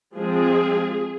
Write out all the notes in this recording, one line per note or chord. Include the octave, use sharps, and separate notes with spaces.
F3 G#3 C4 G#4